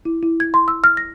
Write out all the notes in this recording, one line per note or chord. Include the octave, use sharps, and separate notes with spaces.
E4
E4
G#6
C6
E6
F6
A#6